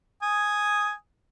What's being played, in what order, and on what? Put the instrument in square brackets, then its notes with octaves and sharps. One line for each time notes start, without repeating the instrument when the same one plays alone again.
[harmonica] G#5 D#6